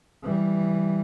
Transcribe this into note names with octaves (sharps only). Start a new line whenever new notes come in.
E3 G3